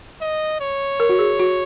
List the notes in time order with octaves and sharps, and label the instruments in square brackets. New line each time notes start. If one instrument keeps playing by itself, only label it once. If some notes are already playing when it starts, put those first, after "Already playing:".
[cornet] D#5
C#5
[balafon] A#4
F#4
G#4
F#4